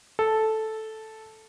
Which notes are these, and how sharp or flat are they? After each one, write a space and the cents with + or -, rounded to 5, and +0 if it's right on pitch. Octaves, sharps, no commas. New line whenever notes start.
A4 -5